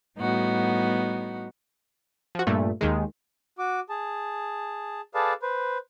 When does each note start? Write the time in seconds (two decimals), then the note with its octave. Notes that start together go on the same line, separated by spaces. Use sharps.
0.19 A2 G3 B3 D#4 F#4
2.35 F3 F#4
2.47 G2 A#2 A3
2.81 D#2 D#3 G#3
3.58 F#4 D6
3.89 G#4 A5
5.15 G#4 A4 B4 D5 F5 A5
5.42 B4 C5